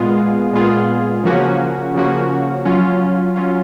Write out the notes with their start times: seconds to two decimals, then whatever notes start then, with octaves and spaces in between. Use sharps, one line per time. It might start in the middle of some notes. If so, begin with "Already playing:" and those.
Already playing: A#2 G#3 B3 F4 G#4
0.53 A#2 G#3 B3 F4 G#4
1.23 C#3 F3 A#3 C#4 F#4
1.94 C#3 F3 A#3 C#4 F#4
2.65 F#3 C#4 F4
3.36 F#3 C#4 F4